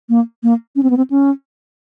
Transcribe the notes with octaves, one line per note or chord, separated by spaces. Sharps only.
A#3
A#3
C#4
C4
B3
C4
C#4